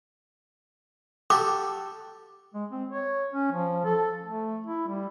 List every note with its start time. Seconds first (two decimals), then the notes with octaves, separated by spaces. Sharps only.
1.30 F#4 G4 A4 D6
2.54 G#3
2.71 C4
2.89 C#5
3.33 C#4
3.52 F3
3.85 A4
4.25 A3
4.67 E4
4.88 G3